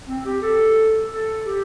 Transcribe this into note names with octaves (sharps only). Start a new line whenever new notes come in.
C4
G4
A4
A4
G4